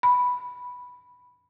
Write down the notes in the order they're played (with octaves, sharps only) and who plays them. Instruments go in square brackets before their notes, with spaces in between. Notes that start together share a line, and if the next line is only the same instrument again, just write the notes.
[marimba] B5